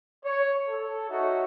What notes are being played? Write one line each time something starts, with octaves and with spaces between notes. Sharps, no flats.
C#5
A4
D#4 F#4 A4 C#5 E5